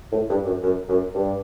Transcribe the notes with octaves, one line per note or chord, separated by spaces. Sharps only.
A2
G2
F#2
F#2
F#2
G2